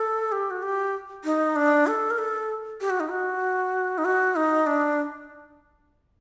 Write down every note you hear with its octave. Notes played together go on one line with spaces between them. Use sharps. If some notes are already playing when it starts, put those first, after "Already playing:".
Already playing: A4
G4
F#4
G4
D#4
D4
A4
A#4
A4
G4
F#4
D#4
F#4
D#4
F#4
D#4
D4